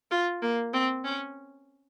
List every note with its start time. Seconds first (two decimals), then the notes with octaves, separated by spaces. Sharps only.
0.11 F4
0.42 A#3
0.73 C4
1.05 C#4